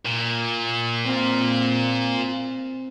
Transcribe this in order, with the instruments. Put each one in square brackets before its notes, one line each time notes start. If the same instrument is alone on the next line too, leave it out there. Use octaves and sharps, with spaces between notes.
[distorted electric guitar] A#2
[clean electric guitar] C4 F4